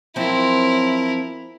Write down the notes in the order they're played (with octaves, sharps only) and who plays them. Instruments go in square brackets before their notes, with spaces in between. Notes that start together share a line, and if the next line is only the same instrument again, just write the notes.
[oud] F3 F#3 C4 [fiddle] E4 A#4